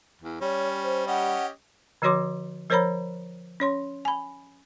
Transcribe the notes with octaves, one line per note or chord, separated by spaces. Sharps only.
E2
G3 C#4 C#5
C5
C#4 G4 D#5 F#5
D3 F3 F#4 C#5 C6 D6
F3 A#4 C5 C#5 A#5 B5
C#4 C#5 C6
G#5 B5